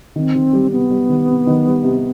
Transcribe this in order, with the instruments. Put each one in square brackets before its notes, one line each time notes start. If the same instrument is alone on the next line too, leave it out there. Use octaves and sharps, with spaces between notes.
[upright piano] D#3 [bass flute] C4
[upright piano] D#3
G3
[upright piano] C3 [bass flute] B3
[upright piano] G3
D#3
C3
D#3
G3
C3